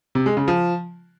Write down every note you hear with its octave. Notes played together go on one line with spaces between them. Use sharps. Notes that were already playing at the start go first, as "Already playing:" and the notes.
C3
G#3
C#3
F3